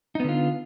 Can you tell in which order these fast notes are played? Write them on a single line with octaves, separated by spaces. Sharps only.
D#4 B3 D3 F4